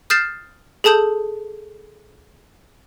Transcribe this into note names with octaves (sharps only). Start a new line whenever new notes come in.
D#6 F6 G6 A6 C7 E7
G#4 A4 A5 D#6 G6